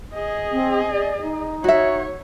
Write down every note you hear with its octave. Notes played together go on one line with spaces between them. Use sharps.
G#4 D#5
C4
D5
D#4
F#4 C#5 E5